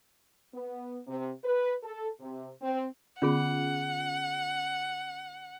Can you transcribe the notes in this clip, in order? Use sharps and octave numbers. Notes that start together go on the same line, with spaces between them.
B3
C3
B4
A4
C3
C4
D3 B3 C#4 F4 G#4 F#5